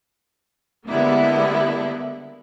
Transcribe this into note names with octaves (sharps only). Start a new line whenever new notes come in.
D3 G3 G#3 A#3 B3 E4